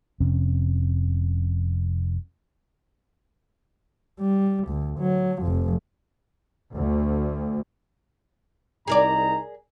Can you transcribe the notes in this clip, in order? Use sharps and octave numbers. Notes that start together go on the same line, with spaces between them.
F1 F2 C3 C#4
G3
D2
F#3
F1 F2
D2
C2 D#4 G#4 A#4 D5 A#5